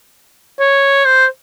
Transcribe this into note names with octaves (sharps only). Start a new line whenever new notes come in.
C#5
C5